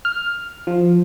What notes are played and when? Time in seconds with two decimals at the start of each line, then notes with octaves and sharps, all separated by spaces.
0.05 F6
0.67 F3